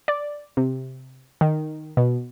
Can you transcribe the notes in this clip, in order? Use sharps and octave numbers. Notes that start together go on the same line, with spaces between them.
D5
C3
D#3
B2